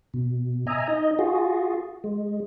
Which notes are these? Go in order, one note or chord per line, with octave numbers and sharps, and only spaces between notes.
B2
D#5 E5 G#5 A#5
D#4 D#5
F4 F#4 G#4
G#3